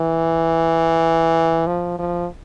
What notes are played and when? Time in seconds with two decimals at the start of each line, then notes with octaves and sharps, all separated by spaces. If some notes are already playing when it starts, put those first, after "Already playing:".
Already playing: E3
1.67 F3
1.99 F3